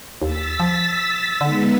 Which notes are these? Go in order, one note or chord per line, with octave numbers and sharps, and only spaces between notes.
D#2 E6 A6 B6
F3
D3 G#3 B3 D#4